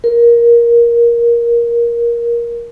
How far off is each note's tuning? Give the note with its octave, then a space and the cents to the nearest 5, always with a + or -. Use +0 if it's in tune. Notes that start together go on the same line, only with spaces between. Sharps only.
A#4 +15